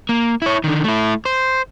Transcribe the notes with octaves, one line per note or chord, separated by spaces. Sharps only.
A#3
E4 C#5
D3 D#3
A3 E4
C5